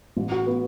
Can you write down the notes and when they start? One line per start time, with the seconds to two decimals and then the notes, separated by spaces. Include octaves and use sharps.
0.17 A1
0.32 F#4
0.47 B3